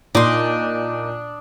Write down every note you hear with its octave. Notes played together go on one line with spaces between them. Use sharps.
A#2 D4 D#4 C6 D6 D#6